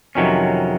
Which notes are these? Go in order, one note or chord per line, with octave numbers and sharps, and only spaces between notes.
F2 C3 D#3 F#3 C#4